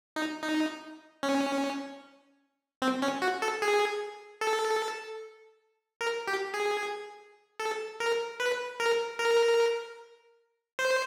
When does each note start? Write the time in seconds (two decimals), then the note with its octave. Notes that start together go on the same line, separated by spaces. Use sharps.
0.16 D#4
0.43 D#4
1.23 C#4
2.82 C4
3.02 C#4
3.22 F#4
3.42 A4
3.62 G#4
4.41 A4
6.01 A#4
6.28 G4
6.54 G#4
7.60 A4
8.00 A#4
8.40 B4
8.80 A#4
9.19 A#4
10.79 C5